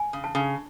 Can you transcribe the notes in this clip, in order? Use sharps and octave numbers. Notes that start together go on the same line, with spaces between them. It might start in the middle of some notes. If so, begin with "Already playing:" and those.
Already playing: G#5
C#3
A5
C#3